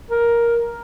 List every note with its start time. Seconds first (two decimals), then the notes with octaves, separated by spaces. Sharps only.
0.10 A#4